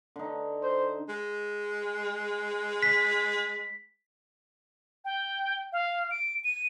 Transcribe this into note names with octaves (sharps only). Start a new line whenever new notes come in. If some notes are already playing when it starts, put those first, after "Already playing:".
D3 D#4
C5
G#3
B6
G5
F5
D7
D#7